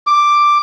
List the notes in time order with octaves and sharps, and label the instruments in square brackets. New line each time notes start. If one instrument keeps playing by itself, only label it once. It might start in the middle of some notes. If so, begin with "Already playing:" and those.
[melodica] D6